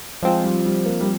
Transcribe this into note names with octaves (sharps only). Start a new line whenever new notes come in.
F3 G#3 C4 F4
G3
G3
A#3
G3